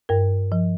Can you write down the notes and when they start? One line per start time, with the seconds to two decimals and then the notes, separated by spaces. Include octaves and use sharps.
0.09 G2 A#4
0.52 F3